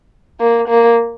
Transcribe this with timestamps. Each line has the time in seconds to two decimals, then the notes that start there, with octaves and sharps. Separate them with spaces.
0.40 A#3
0.68 A#3